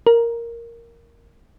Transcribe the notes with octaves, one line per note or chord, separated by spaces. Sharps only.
A#4